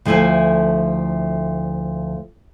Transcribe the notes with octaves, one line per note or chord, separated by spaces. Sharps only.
D2 F3 A3 E4 F5 G#5